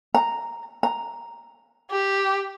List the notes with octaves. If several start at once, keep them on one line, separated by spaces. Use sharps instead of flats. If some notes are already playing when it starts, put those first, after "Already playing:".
A#5
A#5
G4